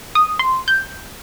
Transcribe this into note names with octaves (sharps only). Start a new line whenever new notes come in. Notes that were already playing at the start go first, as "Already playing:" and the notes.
D#6
C6
G6